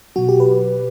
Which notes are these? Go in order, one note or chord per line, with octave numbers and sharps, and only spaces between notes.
B2 F#3 F#4
G4
B4